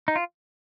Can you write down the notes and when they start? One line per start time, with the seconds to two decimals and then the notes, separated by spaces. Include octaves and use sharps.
0.08 D#4
0.16 F4